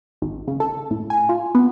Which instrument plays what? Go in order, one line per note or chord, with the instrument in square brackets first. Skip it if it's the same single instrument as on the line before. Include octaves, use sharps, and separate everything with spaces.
[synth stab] G#1
C#3
A4
A2
G#5
F4
B3